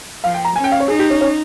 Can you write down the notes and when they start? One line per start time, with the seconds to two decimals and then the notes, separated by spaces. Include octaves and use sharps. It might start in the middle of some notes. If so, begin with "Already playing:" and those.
0.23 F3 F5
0.34 G5
0.45 A#5
0.56 C#4 G#5
0.64 G5
0.72 F5
0.80 C#5
0.88 D#4 G#4
0.99 G4
1.10 C#4
1.21 C#4